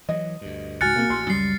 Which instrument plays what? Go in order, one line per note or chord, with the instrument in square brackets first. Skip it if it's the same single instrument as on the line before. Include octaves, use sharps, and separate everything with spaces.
[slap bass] E3 F#3 [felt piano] D#5
[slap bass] D2 G2
[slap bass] C#2 G#2 [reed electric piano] F#4 G#5 F#6 [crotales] F6 A6 C#7
[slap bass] D2 B2 C4 [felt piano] A#3
[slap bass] A1 [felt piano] C6
[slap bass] C#2 F#2 [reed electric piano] G3 [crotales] C7